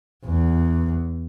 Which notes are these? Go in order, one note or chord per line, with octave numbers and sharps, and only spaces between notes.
E2